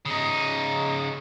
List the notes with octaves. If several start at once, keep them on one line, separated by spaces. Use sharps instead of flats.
C#3 D#4